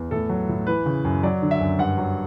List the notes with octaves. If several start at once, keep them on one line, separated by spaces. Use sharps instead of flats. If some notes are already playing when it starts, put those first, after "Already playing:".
Already playing: E2
A2 A4
F#3
A2
E3 B4
C#3
F#2
F#3 D5
D3
E5
F#2
G2 F#5
F#3